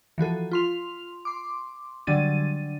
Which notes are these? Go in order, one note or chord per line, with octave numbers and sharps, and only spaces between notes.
E3 F3 F#4 A4
F4 C6 F7
C6 D6
D3 F#3 G3 D4 A6 D#7